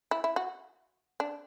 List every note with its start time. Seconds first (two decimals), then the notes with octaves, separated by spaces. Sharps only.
0.11 E4
0.24 E4
0.36 F#4
1.20 D4